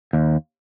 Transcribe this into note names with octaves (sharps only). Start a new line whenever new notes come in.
D#2